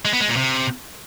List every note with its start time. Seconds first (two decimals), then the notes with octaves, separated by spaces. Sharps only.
0.05 G#3
0.13 B3
0.21 G#3
0.29 A#2
0.36 C3